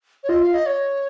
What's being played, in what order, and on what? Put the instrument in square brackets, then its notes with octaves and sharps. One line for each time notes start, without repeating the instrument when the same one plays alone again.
[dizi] C#5
[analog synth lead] F4 [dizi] D#5
[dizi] F5
D#5
C#5